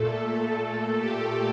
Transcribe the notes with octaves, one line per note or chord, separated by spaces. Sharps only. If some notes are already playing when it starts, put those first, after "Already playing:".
Already playing: A#2 A3 A4
A4
G4